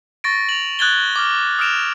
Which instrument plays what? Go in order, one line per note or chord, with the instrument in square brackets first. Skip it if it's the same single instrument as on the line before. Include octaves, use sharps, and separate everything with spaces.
[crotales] C#6 A6 A#6 D7
F7 F#7
D#6 F#6 G#6 A6 G7
D6 F6
D#6 F6 A#6 D7 E7 F7